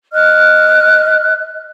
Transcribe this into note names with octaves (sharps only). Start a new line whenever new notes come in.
D#5 F6 F#6